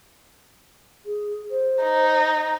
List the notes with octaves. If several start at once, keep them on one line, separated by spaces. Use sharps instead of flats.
G#4
C5
D#4